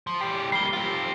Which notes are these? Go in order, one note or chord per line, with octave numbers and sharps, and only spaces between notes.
F3
E3 G4 C7
G3 A#3 C7 G7
F4 G4